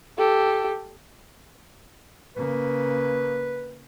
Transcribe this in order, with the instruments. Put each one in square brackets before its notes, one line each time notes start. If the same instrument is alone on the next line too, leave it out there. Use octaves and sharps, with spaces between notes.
[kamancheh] G4 A4
[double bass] C#3 A#3 [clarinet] B4